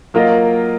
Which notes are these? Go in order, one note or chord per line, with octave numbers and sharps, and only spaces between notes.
F#3 A#3 F4 A#4 D#5